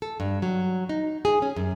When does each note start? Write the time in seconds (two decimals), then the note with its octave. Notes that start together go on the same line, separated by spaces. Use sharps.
0.02 A4
0.20 G2
0.42 F#3
0.89 D#4
1.25 G#4
1.42 C#4
1.56 F#2